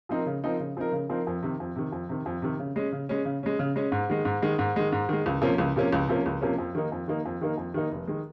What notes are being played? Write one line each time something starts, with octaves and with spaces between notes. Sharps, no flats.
F3 C4 D#4 A#4
C#3
F3 C4 D#4 A#4
C#3
F3 C4 D#4 A#4
C#3
F3 C4 D#4 A#4
F2
C3 D#3
F2
C3 D#3
F2
C3 D#3
F2
C3 D#3
C#3
G#3 C#4
C#3
G#3 C#4
C#3
G#3 C#4
C#3
G#3 C#4
G#2
D#3 G#3
G#2
D#3 G#3
G#2
D#3 G#3
G#2
D#3 G#3
C#2
C3 F3 A#3 C#4
C#2
C3 F3 A#3 C#4
C#2
C3 F3 A#3 C#4
C#2
C3 F3 A#3 C#4
F2
D#3 A#3 D#4
F2
D#3 A#3 D#4
F2
D#3 A#3 D#4
F2
D#3 A#3 D#4
F1
D#3 G#3